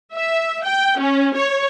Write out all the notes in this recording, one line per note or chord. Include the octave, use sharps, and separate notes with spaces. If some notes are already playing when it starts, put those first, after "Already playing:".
E5
G5
C#4
C#5